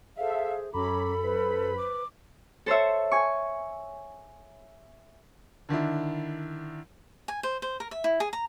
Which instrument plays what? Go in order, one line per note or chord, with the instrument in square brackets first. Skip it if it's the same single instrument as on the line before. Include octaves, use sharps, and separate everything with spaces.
[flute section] G#4 C5 [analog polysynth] A4 E5 [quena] F5
[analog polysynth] F#2 B5 [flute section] C#4 A#5 D6 [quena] A4
[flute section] B4 C5
[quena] D6
[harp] A4 C5 C#5 E5
G#5 C#6
[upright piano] D3 D#3 D4 E4
[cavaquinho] G#5
C5
C5
A#4
E5
E4
G#4
A#5